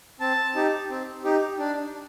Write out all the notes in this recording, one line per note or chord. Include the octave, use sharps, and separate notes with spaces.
C4 A5
D#4 G4
C4
D#4 G4
D4